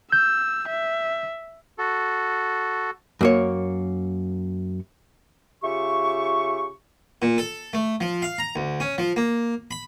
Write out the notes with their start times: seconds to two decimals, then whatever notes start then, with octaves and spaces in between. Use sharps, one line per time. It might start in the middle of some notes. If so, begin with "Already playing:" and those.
0.12 E6 G6
0.69 E5
1.78 F#4 A4
3.21 F#2 A#3 C#5
5.63 C#3 F4 G4 E5 C#6
7.22 A#2
7.38 A4
7.73 A3
8.01 F3
8.22 F5
8.38 A#5
8.56 D2
8.80 C#4
8.98 F3
9.16 A#3
9.71 B5